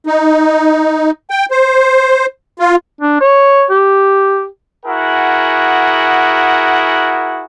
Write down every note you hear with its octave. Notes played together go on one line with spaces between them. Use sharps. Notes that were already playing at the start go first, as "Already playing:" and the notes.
D#4
G5
C5
F4
D4
C#5
G4
E4 F#4 G#4 A#4 F#5